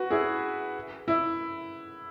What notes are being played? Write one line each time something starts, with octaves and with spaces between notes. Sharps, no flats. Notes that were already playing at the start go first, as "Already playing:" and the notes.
Already playing: F#4 B4
E4 G#4
E4